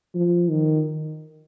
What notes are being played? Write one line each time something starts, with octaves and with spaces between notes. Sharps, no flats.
F3
D#3